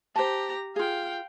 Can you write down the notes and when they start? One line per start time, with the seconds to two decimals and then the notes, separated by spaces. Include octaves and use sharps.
0.16 G4 C5 A5 A#5
0.76 F4 G#4 F5 G5